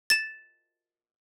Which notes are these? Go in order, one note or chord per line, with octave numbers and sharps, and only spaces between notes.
A6 E7